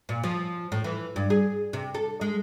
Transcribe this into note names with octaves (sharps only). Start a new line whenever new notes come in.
A#2
F3
A2
E3
G2
G#4
C3
A4
G#3